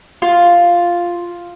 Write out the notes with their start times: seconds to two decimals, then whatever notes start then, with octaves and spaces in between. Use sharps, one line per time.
0.22 F4